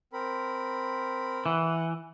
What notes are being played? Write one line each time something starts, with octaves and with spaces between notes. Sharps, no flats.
C4 A#4 B5
E3 F#5